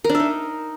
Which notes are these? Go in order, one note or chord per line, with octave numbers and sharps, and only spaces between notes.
A#4
D4
E5
D#4